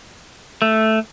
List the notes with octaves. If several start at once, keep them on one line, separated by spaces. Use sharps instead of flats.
A3